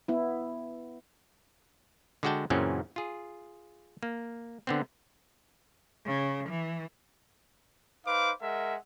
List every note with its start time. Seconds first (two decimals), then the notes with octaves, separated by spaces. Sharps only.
0.08 B3 E4
2.23 D3 G#3 F#4 D5 G5 A5
2.50 F#2 A#2 C#3 E3 C4 C#4
2.96 F4 G#4
4.03 A#3
4.67 D3 B3 C4
6.06 C#3
6.50 E3
8.06 D#4 B4 C5 F5 D6
8.41 G#3 A#4 E5 F#5